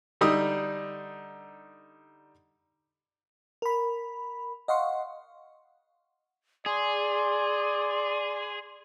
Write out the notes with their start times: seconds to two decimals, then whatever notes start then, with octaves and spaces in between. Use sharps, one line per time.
0.21 D3 G3 D#4 D#6 E6
3.62 A#4 B5
4.68 D#5 F5 F#5 C6 C#6
6.66 G#4 D5 C6